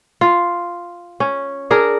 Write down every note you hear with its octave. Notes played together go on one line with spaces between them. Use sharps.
F4
C#4
D4 G#4 A#4